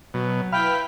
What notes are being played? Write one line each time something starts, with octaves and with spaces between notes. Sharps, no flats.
B2 F#3
E4 B4 F5 G5 B5 F6 B6